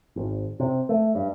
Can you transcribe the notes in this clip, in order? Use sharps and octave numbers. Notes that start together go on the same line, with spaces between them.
G#1
C3
A3
G2